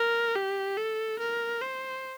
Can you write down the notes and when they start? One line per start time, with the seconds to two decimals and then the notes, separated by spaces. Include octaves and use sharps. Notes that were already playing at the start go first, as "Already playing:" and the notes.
Already playing: A#4
0.36 G4
0.77 A4
1.20 A#4
1.62 C5